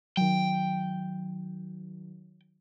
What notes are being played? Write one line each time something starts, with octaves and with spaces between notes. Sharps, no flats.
D#3 F#3 G5